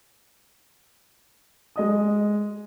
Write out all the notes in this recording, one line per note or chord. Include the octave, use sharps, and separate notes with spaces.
G#3 D#5 D#6